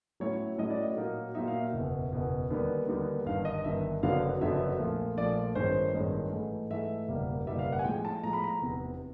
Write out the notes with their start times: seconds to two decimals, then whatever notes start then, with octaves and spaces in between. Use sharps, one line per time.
0.20 A2 F#3 A3 C#4 E4 C#5
0.58 A2 F#3 A3 C#4 E4 D#5
0.70 D5
0.83 D#5
0.97 A#2 F#3 A#3 D#4
1.35 A#2 F#3 A#3 D#4 E5
1.48 F5
1.60 E5
1.73 F#1 E2 B2
2.12 F#1 E2 B2
2.50 D#2 D3 G3 B3 D#4
2.88 D#2 D3 G3 B3 D#4
3.26 G1 G2 D#3 F5
3.45 D#5
3.64 G1 G2 D#3 E5
4.02 F#1 F2 D3 F#3 B3 F5
4.40 F#1 F2 D3 F#3 B3 E5
4.79 A#1 A#2 F3 A3
5.17 A#1 A#2 F3 A3 D5
5.55 A1 G2 D#3 G#3 C#4 C5
5.94 A1 G2 D#3 G#3 C#4
6.32 G#2 E3 A3
6.70 G#2 E3 A3 E5
7.08 F#1 E2 B2 G3 A#3
7.47 F#1 E2 B2 G3 A#3 E5
7.59 F5
7.72 F#5
7.79 G#5
7.84 A2 F3 G#3 G5
8.05 A5
8.23 A2 F3 G#3 A#5
8.33 B5
8.44 A#5
8.62 F1 E2 C3